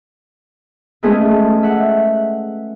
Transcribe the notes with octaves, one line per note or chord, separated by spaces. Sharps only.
F3 G#3 A3 C#4 G#4 B4
E5 F#5